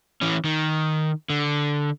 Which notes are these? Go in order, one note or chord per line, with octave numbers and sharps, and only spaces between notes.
E3 C#4
D#3
D3